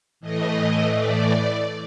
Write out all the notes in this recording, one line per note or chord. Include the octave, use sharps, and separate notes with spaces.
A2 E3 A3 D#5
D5